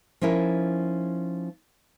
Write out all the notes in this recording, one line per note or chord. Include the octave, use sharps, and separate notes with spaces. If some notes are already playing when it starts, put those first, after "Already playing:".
F3 C#4 D#4 E4 A#4